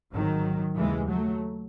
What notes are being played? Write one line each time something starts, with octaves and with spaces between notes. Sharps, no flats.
G#1 G#2 D#3 F#3
D#2 C#3 E3 G#3
F#3 A3